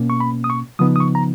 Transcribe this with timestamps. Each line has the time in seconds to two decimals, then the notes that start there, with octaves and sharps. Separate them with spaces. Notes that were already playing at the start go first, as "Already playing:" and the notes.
Already playing: B2 A#3 C#4
0.10 C#6
0.20 B5
0.44 D#6
0.50 C#6
0.79 C#3 F3 B3 D#4 D#6
0.96 D#6
1.00 C#6
1.15 A#5